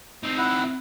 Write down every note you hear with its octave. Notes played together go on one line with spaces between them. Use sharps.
C4 D#4
E4 F#5